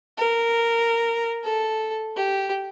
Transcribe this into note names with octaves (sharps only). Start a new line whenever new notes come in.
A#4
A4
G4